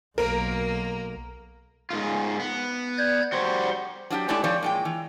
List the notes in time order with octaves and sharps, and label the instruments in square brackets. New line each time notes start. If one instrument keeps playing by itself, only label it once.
[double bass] B1 [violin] A#3 [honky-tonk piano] A#4
[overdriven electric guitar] G#2 F4
B3
[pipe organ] D5 G6 G#6
[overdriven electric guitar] G3 F#4 [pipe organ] C5 F#5 C6
[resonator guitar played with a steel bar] F#3 D4 F4 G4
G#3 A3 D4 E4 G4 C#5
F3 C4 C#5 D5
A#2 G#3 G5
E3